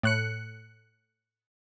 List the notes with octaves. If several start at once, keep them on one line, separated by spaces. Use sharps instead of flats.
A2 F#6 C#7